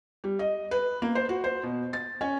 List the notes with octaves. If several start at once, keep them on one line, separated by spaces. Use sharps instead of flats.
G3
D#5
B4
A#3
C5
F#4
C5
B2
A6
C#4